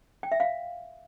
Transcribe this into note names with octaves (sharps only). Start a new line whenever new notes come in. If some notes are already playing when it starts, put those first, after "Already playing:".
G5
E5
F5